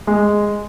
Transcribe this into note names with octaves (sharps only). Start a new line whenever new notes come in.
G#3